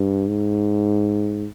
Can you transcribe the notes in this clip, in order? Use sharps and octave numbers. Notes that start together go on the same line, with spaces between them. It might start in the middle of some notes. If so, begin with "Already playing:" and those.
Already playing: G2
G#2